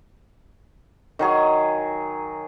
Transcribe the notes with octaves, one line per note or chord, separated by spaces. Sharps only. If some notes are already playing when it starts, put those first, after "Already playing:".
D#3 F#3 G#4